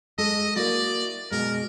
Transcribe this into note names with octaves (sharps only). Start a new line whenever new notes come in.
G#3 A4 D#5
A#3 E4 F#4 D5
B2 G#3 A#4